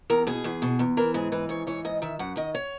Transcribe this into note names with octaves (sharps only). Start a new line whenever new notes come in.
E2 A#4
B2 G#4
E2
B2
E2
E3 A#4
G#2 G#4
E3 B4
G#2 C#5
E3 C#5
G#2 D#5
D#3 E5
F#2 F#5
D#3 D#5
C#5